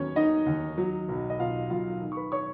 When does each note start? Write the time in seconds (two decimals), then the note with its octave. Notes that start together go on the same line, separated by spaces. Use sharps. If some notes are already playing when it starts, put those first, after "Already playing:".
Already playing: D#2 F#3 B3 C#4 C#5
0.16 D#3 D#4 D#5
0.46 D#2
0.78 F#3
1.09 B1
1.30 D#5
1.39 B2 F4 F5
1.70 B1 F4 F5
2.01 D#3
2.12 C#6
2.17 B4 B5
2.32 C#5 C#6